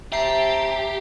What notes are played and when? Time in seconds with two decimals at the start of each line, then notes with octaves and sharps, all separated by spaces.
0.12 C4 G4 E5 A5 A#5 C7